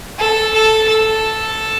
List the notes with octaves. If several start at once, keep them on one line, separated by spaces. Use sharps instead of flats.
A4
A4
A4